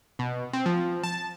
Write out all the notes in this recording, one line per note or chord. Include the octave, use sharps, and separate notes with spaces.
B2
C4
F3
A5